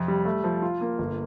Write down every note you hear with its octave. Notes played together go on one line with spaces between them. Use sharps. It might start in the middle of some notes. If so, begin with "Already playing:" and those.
Already playing: F2 C3
G3
A3
F3
F4
A#3
G1